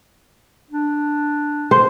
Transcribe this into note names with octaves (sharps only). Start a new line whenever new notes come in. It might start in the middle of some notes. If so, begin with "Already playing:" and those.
D4
C5